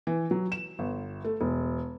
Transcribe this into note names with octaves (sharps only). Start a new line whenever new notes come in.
E3
F#3
E7
G1
A3
E1